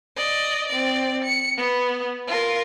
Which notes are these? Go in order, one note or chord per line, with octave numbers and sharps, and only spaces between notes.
D5 D#5
C4 D5
C#7
B3
F4 A#4